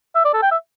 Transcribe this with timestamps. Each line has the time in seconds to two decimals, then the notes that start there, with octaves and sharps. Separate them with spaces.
0.15 E5
0.25 D5
0.34 A4
0.42 G5
0.51 E5